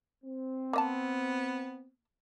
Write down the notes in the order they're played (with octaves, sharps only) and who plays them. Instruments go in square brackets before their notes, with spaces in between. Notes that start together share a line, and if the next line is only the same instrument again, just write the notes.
[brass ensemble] C4
[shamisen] A#3 D#5 A5 [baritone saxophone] B3